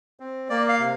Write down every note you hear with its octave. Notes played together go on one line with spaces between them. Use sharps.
C4
A#3 D5
F5
C3